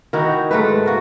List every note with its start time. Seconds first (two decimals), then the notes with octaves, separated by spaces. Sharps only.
0.13 D#3 D#4 E4 F#4
0.51 G#2 A3 A4 B4
0.86 A#3 F#4